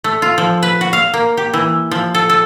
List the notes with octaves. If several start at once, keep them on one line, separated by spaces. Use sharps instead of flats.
A3
F4
F3
B4
F#4
F5
A#3
G4
E3
F3
A4
A4